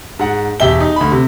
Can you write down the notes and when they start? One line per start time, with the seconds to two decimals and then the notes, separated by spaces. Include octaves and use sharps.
0.19 G#2 F#5
0.60 E1 G4 E5 G7
0.80 D#4
0.96 D2 B5
1.12 C3